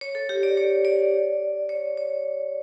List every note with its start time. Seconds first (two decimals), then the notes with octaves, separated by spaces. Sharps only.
0.01 C#5
0.15 A4
0.29 G4
0.43 D5
0.57 C#5
0.85 D5
1.69 C#5
1.97 C#5